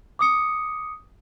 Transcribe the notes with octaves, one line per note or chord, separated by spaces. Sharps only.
D6 D#6 C#7